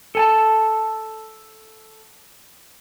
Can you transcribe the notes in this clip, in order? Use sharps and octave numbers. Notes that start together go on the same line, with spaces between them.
A4 G#5 A5